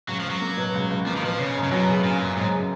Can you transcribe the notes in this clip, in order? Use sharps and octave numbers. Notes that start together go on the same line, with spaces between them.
C#2 F#3
F3
C#2 F#3
A#3
B2
C#2
C#2
F3 A#3
D#3
B2 F3
C#3 C#4
F#2
C#3
B2 F#3
C#3
A#2 C#4
F#2
G#2 F#3
C#3